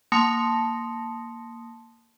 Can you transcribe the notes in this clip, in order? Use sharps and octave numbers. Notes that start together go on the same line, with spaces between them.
A#3 A5 C6 D#6 A#6 C#7